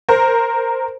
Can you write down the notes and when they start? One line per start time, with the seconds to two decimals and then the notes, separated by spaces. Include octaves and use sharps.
0.08 A#4 C5